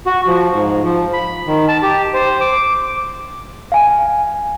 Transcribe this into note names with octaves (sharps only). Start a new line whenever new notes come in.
F#4
F3
G#2
F3
B5
D#3
A5
G4
C5
D6
F5 G#5